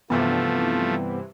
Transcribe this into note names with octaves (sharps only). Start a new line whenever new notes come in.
G2 C3 E3 F3 A3 B3